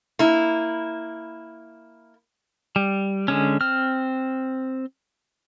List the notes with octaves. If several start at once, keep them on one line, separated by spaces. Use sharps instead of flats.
A#3 E4
G3
D3 G#3 C#4
C4 F6